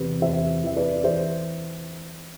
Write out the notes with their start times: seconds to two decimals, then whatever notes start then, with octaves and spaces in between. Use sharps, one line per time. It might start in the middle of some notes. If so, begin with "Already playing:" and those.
Already playing: E2 C3 B4
0.22 E2 C5 E5
0.63 E3 E5
0.76 B4 D5
1.04 E3 C5 E5